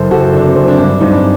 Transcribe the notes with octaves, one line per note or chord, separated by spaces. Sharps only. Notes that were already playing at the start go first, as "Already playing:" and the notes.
Already playing: F#1 A4 C5
F#1 F#4 A4
D3 D4
C4
F#2 C4
D4
G2 D4
G2 C4 D#4
D4